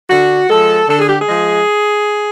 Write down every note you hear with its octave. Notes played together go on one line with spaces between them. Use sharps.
D3 F#4
F3 G#3 A4
D3 A4
G#4
G4
G#4
F3 G#3